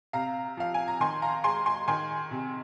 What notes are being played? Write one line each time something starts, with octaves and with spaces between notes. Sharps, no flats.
C3 F5 A#5
F3 F5
G#5
A#5
D#3 G#5 C6
F5 A#5
G#3 G#5 C6
G#5 C6
D#3 G#5 C6
C3